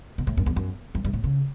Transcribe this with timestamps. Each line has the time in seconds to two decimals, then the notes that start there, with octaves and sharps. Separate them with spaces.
0.18 B2
0.27 A2
0.37 F#2
0.46 E2
0.56 F#2
0.95 F#2
1.04 G2
1.13 A2
1.24 C#3